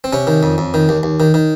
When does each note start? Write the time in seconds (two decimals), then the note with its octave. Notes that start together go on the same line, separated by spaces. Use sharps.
0.04 C4
0.13 C3 C#4
0.27 D#3
0.43 F2
0.58 F2
0.74 D#3
0.89 D#2
1.03 D#2
1.20 D#3
1.34 D#3